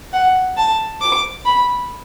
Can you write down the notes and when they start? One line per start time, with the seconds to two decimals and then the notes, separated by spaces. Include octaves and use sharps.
0.13 F#5
0.57 A5
1.01 D6
1.45 B5